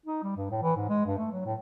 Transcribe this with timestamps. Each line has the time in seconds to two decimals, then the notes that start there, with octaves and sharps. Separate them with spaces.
0.06 D#4
0.23 G3
0.36 G2
0.51 A2
0.63 E3
0.76 G#2
0.89 G#3
1.06 G2
1.18 A3
1.32 F#3
1.46 A2